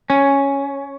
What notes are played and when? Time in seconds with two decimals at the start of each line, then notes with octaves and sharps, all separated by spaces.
0.10 C#4